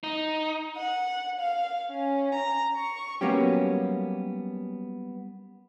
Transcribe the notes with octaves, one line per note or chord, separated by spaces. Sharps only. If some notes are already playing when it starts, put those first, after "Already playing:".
D#4
F#5
F5
C#4
A#5
C#6
F#3 G3 A#3 B3 C#4 G4